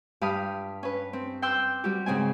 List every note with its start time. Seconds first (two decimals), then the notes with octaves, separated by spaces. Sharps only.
0.21 G2 G4 F5 B5 D#6 F6
0.83 C#4 B4
1.13 C4
1.42 G5 C6 D6 E6 F#6 G6
1.84 G3 F#4 G4
2.06 G#2 C#3 C4 G#5